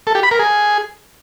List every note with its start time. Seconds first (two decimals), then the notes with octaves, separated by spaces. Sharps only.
0.07 A4
0.15 G4
0.23 B5
0.31 A#4
0.39 G#4